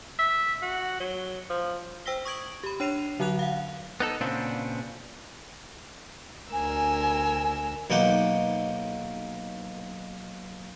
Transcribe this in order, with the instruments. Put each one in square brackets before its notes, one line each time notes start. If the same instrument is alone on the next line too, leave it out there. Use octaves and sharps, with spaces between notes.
[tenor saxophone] E5
F#4
F#3
F3
[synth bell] C5 G5 E6 A#6 B6 G7
C#6 D#6 G#6 D7 F#7
G4 B5
D4 C#5 C7 D#7 F7
D3 F#3 F#4 F#5 F#6 F7
F5 F#5
[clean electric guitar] B3 D#4 A4
A#2 C#3 B3 C4 D4
[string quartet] D2 A#4 E6 [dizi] G#5
[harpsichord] B1 A#3 D#4 F#5 G5 D6